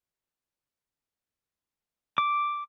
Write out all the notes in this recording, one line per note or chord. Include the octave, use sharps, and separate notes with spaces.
D6